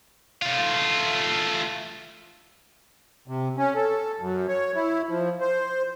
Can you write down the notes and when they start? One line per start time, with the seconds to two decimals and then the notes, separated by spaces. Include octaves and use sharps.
0.42 A3 F4
3.28 C3
3.57 C#4
3.75 A4
4.20 F#2
4.48 C#5
4.75 E4
5.09 F3
5.41 C5